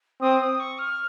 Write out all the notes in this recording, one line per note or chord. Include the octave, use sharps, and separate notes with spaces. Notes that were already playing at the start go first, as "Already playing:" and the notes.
C4 D#6
D#6
C#6
F6